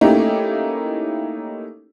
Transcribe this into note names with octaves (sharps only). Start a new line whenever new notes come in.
A3 A#3 C#4 D#4 E4 G4